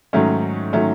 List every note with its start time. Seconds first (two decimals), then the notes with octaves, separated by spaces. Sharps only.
0.13 G#2 D#3 F#3 A3 C#4
0.73 D#3 F#3 A3 C#4